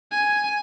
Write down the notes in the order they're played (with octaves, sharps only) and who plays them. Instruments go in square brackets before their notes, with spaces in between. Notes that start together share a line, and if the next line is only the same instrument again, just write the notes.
[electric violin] G#5